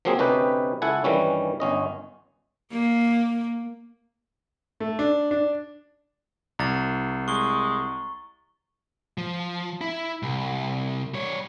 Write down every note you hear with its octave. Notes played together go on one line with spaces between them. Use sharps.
F3 F#3 A#3 C4 G#4
D2 C3 C#4 D#4 G4 B4
C#2 E4 A4 F#5 G#5
G2 D#3 E3 G3 C#4
G1 C#4 D#5
A#3
A3
D4
D4
C2 A#5 A6
G#3 C#6 G7
F3
E4
C2
G3 C#5